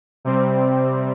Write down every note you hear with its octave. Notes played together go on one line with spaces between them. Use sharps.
C3 G3 C4